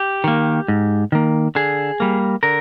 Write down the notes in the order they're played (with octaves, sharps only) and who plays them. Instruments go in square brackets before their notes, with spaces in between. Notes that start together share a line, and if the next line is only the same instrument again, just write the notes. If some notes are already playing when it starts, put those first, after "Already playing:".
Already playing: [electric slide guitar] G4
D#3 A#3
G#2
D#3 A#3
D3 G#4
G3 A#3
D3 A#4